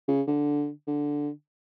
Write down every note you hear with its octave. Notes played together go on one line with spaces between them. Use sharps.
C#3
D3
D3